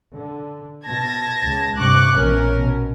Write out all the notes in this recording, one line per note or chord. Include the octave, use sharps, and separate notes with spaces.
D3
B2 A5 G#6 A#6
C#2
G2 C3 G3 C#6 D6 F#6
A#1 B2 E3 C#4 A#4
B2